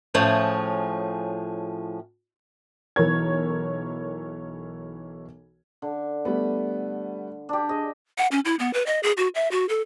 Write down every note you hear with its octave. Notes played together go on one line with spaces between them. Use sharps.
A2 F3 C#4 G#4
B1 E3 A#4 C#5 G#6
D3
G3 A3 B3 B5
D4 G4
G#4 D#5
F#5
C#4
E4
B3
B4
D#5
G#4
F#4
E5
F#4
A4